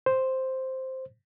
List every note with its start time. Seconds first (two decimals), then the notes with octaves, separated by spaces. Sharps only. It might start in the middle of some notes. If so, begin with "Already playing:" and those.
0.06 C5